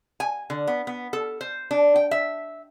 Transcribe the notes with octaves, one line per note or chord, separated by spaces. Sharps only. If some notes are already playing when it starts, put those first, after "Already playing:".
G#5
D3
B3
B3
A4
C5
D4
G5
E5